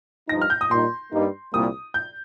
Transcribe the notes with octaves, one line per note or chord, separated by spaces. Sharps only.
G2 F3 D#4 A#6
F6
G6
D#6
A#2 G3 D#4 C6
G2 G3 A#3 D#4
C2 A#2 G3 A#3 D#6
G6